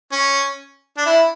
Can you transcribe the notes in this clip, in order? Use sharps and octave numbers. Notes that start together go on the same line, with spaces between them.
C#4
D4
E4